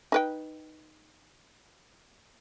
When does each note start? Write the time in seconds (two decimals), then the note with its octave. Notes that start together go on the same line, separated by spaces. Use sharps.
0.12 D#4 B4 G5